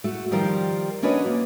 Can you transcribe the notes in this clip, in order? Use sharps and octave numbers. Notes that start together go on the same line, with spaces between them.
A3 F#4
D#3 F3 G3 F4 A#4
C#4 D4 F#4 B4 C#5 D#5
A#3